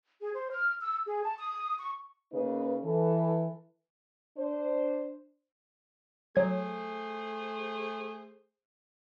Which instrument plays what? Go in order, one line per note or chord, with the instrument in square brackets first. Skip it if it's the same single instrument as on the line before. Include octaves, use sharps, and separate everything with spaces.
[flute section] G#4
C5
F6
E6
G#4
A5
D#6
C#6
[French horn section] C#3 A#3 D#4 G#4 B4
E3 A4
D4 C5
[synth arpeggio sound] F#3 G#6 [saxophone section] A3 G#4 C5